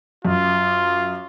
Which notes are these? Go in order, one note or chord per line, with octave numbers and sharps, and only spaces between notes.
F#2 F4